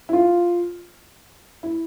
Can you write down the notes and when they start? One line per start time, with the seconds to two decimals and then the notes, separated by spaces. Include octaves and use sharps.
0.09 E4
0.13 F4
1.63 E4